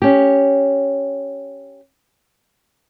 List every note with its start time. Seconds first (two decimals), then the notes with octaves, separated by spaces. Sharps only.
0.02 C#4 G4